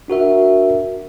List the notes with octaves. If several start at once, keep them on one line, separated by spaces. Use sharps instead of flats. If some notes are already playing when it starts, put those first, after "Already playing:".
D4 F#4 A#4 E5